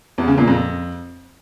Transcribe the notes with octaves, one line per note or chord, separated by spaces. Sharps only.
E2
C#3
A#2
F2